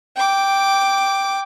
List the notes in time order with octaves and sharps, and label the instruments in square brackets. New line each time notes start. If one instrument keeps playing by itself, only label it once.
[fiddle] G5 D6